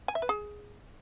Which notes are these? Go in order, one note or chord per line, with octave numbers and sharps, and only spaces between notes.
G#5
E5
B4
G#4